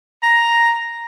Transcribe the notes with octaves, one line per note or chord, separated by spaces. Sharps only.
A#5